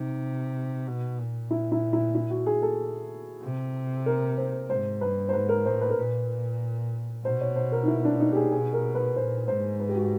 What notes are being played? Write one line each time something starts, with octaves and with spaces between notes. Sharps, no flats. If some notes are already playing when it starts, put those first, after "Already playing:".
Already playing: C3 D#4
B2
A#2
E4
E4
E4
E4
F#4
G#4
A4
C3
A#4
C5
G#2 C5
G2 B4
C5
G#2 B4
A#4
A2 C5
B4
A#4
A#2 B4
B2 C5
C#5
C5
A#4
D#4
E4
D4
D#4
G4
G#4
B2 G#4
A#4
B4
A#2 C5
G#2 C5
B4
G4
F#4